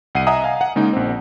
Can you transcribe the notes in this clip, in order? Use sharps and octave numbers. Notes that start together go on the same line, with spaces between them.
C2 F#5 C7 D#7
D#5 E5 F#5 G#5 A#5 D#6
F5 G#5 A#5
F#5
C#3 G#3 A#3 D#4
A#1 C4